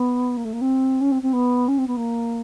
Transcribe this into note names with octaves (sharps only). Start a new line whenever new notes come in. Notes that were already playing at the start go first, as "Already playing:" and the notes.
Already playing: B3
A#3
A3
A#3
C4
C#4
C4
C4
B3
C#4
C4
B3
A#3